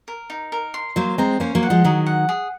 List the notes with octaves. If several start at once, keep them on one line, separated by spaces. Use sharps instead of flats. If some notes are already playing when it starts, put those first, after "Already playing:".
A#4
D#4
A#4
C6
F#3 A#3 C5
G#3 C4 A#5
A#3 C#4 C5
F#3 A#3
F#5
F3 G#3
D#3 F#3 G#4
F#5
G#4